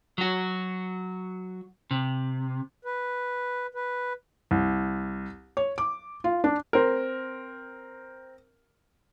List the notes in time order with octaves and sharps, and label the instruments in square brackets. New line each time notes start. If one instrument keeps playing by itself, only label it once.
[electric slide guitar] F#3 F#4
C3
[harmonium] B4
B4
[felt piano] C2
C#5
D6
F4
D4
[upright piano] C4 A#4